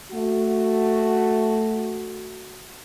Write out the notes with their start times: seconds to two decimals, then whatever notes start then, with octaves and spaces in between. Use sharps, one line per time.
0.12 A3 F#4